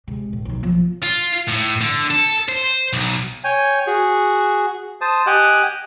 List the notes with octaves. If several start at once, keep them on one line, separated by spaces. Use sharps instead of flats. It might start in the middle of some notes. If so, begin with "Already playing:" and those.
C3 G#3
A2
B1 D#4
F3 A#3
F4
A2
D3
A4
C5
B1
C#5 G5 G#5
F#4 G#4
C5 A5 D#6
G4 D#5 F#5 G#5 D6 F#6